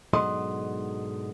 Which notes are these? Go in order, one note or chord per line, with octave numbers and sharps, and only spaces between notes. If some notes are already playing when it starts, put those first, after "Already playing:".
G#2 B2 D3 F#3 D#5 C6